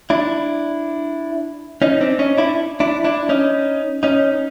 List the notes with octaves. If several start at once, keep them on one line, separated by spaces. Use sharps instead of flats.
D4 E4
C#4 D#4
C4 D4
C#4 D#4
D4 E4
D4 E4
D4 E4
C#4 D#4
C#4 D#4